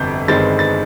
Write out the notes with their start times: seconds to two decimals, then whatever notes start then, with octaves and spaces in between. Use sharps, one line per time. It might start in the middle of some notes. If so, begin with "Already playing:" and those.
Already playing: G1 F2 C3 G6
0.28 G1 G2 D#3 G#3 C4 A6
0.59 A6